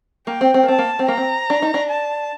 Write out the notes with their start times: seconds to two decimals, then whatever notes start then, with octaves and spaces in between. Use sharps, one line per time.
0.27 A#3 G5
0.41 C4
0.54 C4
0.63 A#3
0.68 C4 A5
0.79 A#3
0.99 C4
1.08 A#3 A#5
1.17 C4
1.50 D4
1.62 D#4
1.74 D4
1.90 A5